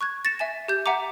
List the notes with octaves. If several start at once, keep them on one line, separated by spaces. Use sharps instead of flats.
C#6 F#6 G#6
A6 A#6 C#7 E7
E5 G#5 E7
G4 G6
E5 F#5 G#5 A#5 D6